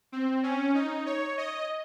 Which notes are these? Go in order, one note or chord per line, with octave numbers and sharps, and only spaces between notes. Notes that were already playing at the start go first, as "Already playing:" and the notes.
C4
C#4
D#4
C#5
D#5